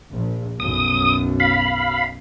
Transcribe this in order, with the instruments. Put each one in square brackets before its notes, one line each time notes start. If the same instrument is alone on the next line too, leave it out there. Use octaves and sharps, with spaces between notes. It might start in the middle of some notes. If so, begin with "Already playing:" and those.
[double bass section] A#1
[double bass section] B1 F#2 [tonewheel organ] D#6
[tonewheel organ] F5 B5